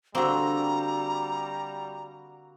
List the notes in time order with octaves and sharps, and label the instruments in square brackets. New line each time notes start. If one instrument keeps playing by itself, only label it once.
[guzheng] D3 C4 [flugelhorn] G3 [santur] A#3 F#4 E6 [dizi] A#5